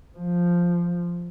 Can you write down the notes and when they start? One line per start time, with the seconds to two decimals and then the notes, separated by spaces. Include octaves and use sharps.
0.18 F3